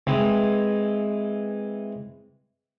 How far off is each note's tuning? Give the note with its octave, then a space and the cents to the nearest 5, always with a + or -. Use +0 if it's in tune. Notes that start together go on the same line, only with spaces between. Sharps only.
E3 +0 G#3 +0 C4 -10